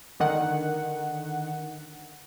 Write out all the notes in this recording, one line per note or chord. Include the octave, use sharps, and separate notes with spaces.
D3 D#3 F#5